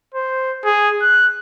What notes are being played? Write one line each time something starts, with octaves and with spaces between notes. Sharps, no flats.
C5
G#4
F#6